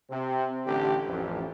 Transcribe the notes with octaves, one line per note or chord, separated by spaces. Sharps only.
C3 C4
A1 D3 G4
A1 F2